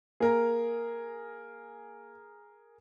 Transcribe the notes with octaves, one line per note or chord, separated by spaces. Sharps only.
A#3 G#4 A#4 A#5